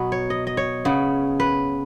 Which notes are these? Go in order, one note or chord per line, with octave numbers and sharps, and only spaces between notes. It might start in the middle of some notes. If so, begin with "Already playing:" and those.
Already playing: B2 F#3 B3 B4
C#5
D#5
D#5
C#5
C#3 B3
B4